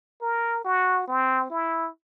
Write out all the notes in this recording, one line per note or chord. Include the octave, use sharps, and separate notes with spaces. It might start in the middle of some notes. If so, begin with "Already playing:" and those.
A#4
F#4
C4
E4